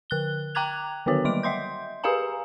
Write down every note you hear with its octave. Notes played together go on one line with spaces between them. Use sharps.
D3 F#6 G7
G5 A#5 D6 F#6 G#6 F7
D3 D#3 B3 F#4 C#5
F#3 G3 D6 D7
D#5 E5 C6 G6
G4 G#4 B4 F5 G#5 A#5